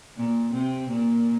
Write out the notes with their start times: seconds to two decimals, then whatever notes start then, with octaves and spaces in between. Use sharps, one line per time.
0.17 A#2 A#3
0.53 C3 C4
0.89 A#2 A#3